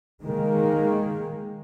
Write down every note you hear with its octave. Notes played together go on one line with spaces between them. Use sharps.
D#3 G#3 A#3